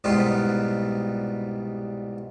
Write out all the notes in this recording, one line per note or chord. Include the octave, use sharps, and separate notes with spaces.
C2 G#2 B2 G3 F4 B4